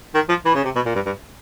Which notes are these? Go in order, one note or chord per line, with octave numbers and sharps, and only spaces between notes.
D#3
F3
E3
C#3
C3
B2
A#2
G2
G2